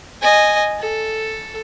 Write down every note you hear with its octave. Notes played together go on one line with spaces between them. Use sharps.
D#5 G#5
A4